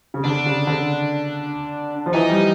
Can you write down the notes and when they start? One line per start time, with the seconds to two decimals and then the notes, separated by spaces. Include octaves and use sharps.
0.14 C#3
0.25 D3 D4
0.46 C#3
0.67 D3
2.06 F3
2.13 E3 D#4
2.30 G3